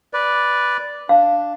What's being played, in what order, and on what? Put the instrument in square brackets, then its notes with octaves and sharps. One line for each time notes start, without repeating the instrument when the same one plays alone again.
[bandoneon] B4 D5
[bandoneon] D4 [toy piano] F5